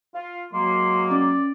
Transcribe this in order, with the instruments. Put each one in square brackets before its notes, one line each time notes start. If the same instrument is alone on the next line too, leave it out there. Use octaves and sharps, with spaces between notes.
[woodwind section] F4
[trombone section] F#3 [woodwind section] G#3 A#3 [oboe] C6
[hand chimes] C#4 [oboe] D5